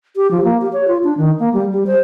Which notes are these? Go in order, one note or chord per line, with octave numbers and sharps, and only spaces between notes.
G4
F3
A#3
G4
C#5
F4
D4
D#3
A#3
G3
G3
C5